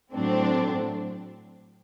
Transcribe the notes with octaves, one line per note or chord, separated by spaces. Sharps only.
A2 F#3 A3 C4 D4